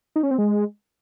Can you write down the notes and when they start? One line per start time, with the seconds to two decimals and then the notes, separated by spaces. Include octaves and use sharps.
0.16 D#4
0.23 C#4
0.31 C4
0.38 G#3